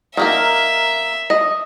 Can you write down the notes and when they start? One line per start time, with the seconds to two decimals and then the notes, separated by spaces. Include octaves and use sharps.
0.17 D#3 A#3 A#4 E5
1.30 D#5